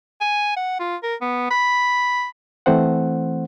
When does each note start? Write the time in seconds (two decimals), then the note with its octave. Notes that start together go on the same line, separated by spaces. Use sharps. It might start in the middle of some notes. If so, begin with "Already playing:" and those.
0.21 G#5
0.56 F#5
0.80 F4
1.03 A#4
1.21 B3
1.51 B5
2.66 E3 A3 C4 C5 F#5